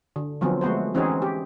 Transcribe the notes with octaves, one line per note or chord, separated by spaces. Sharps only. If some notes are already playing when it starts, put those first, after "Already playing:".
D3
D3 F3 F#3 B3 C4
G#3 A3 B3 F#4 C5
E3 C4 C#4 D#4 F#4 G#4
G4